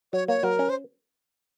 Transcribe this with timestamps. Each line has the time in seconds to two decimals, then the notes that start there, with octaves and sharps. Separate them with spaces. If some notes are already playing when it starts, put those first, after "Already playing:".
0.13 F#3 C#5
0.28 A#3 C#5
0.43 F#3 A#4
0.59 C#4
0.70 C5